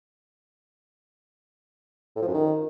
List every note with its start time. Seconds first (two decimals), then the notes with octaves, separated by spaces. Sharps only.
2.16 A2
2.22 F3
2.28 F#2
2.34 D#3